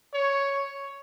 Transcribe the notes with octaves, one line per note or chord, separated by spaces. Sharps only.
C#5